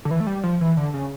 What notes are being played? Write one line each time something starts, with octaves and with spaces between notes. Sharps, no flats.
D3
E3
A3
G3
F3
E3
D3
C#3